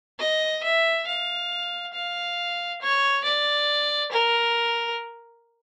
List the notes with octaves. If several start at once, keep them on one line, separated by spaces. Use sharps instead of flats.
D#5
E5
F5
F5
C#5
D5
A#4